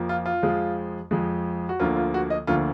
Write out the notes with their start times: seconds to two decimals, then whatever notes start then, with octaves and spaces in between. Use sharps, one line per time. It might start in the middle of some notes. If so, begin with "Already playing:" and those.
Already playing: F2 F3 A#3
0.09 F4
0.26 F4
0.43 F2 F3 G#3
1.11 F2 F3 G#3
1.69 F#4
1.80 D2 D3 F3 A#3 F4
1.96 F4
2.14 F#4
2.30 D#5
2.47 D2 D3 F3 A#3 F4